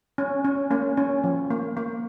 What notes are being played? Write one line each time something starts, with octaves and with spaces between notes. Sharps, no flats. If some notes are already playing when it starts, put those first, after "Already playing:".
C#4
C#4
A#3 C#4
C#4
F3
A#3
A#3